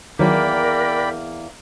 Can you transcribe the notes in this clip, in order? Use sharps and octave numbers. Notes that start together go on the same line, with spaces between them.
E2 D#3 F#3 A#3 A#4 D5 G5 B5